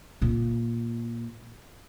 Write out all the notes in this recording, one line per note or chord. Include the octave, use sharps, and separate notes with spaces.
A#2 A#3